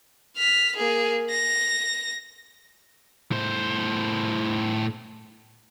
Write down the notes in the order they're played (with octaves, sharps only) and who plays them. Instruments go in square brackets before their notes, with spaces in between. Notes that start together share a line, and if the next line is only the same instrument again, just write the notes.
[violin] F6 B6
A#3 G#4
A#6
[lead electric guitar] A2 C5